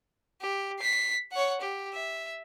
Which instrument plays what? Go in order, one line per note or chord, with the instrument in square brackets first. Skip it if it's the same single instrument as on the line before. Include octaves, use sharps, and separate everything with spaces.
[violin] G4
B6 C7
C#5 F#5
G4
E5